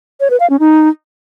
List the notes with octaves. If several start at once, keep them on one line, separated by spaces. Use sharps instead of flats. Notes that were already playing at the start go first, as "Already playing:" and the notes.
C#5
B4
F5
C#4
D#4